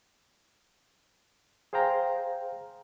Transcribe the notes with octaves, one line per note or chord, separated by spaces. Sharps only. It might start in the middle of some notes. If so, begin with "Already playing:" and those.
G#4 C5 F5 G5 A#5